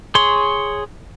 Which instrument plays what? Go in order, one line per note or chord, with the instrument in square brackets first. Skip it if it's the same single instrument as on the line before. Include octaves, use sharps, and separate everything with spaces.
[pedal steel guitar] G#4 C#5 C6